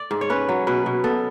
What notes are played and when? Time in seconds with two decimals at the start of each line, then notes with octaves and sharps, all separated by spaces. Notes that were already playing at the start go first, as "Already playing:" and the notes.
Already playing: D5
0.11 G#2
0.21 C#5
0.30 C#4 B4
0.49 F#3
0.67 B2 B4
0.86 B2
1.04 B3 A4